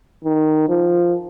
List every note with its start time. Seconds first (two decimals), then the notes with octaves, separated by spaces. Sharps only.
0.24 D#3
0.69 F3